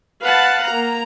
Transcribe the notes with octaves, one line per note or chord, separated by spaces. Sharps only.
B4 F5 F#5 A5
A#3 A#5